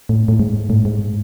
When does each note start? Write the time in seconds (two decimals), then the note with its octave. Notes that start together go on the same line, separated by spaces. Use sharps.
0.09 A2
0.28 A2
0.40 G#2
0.70 A2
0.85 G#2